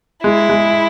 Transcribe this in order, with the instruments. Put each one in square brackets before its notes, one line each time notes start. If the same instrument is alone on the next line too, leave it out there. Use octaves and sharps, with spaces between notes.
[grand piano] G#3 [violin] E4
[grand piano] G#3